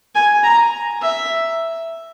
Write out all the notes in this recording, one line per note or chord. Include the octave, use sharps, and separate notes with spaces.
G#5
A#5
E5